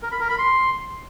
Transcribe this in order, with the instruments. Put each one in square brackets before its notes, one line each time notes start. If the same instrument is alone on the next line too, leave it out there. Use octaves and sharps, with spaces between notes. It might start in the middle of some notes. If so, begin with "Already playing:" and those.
[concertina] A#4
B5
A#4
B5
C6